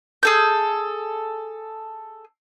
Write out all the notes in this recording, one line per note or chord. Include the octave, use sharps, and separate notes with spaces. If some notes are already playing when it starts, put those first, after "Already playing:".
G#4 A4 G6